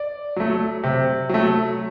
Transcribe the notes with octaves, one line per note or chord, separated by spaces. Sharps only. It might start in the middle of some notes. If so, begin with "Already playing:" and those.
Already playing: D5
F#3 A3
C3
F#3 A3